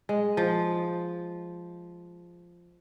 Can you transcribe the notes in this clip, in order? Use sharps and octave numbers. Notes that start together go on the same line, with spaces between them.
G#3
F3